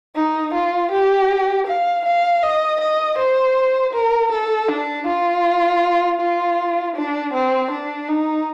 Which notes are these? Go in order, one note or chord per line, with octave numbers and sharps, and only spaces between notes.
D#4
F4
G4
F5
F5
D#5
D#5
C5
A#4
A4
D4
F4
F4
D4
C4
D4
D#4